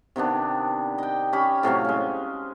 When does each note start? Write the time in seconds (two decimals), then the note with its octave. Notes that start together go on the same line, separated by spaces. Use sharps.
0.16 C3 D#3 B3 D4
0.98 D#5 G5
1.33 C#4 G4 C#5 B5
1.63 A2 C3 F#3 F5
1.85 G#3 C#4